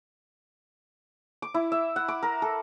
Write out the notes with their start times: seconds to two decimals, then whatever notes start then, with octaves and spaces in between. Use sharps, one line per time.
1.42 D6
1.54 E4
1.72 E5
1.96 F#5
2.08 D6
2.23 A#4
2.42 A4